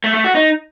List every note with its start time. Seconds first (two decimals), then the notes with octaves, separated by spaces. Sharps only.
0.04 A3
0.14 A3
0.25 F#4
0.35 D#4